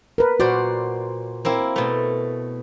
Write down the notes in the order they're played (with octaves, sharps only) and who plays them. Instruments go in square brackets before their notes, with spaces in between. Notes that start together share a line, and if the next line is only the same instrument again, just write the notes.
[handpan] A#4 B4
[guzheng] A#2 C5 D5 [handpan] F#4
[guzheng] A#3 C4 E4
B2 A3